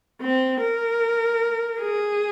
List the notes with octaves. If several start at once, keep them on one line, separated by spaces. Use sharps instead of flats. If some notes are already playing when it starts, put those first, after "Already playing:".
C4
A#4
G#4